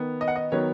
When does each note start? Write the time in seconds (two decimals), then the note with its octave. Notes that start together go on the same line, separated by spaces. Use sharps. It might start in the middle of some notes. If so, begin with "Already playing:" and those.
Already playing: D#3 B3
0.21 D#5
0.28 F#5
0.36 D#5
0.52 D#3 F#3 B3 C#5